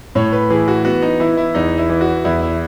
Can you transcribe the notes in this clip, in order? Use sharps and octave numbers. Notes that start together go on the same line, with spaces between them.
A2 C#5
B4
E3 G#4
F#4
B3 F#4
D#4
E3 E4
E4
E2 D#4
E4
E3
F#4
E2 E4
E4